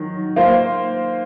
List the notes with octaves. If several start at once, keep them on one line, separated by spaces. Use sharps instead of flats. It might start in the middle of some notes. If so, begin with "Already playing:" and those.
Already playing: D#3 F#3
A#3 F4 C5